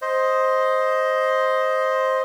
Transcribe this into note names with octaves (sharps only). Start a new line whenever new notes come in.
C5 D#5